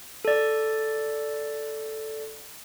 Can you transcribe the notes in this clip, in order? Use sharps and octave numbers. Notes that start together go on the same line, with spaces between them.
A4 D5